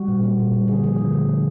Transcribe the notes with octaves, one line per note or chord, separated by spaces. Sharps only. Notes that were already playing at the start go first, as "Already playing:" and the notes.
Already playing: G3 F#4
A#2
A#3
A#2
G3
D3 G#4
F3 G#4
D3
A3
D3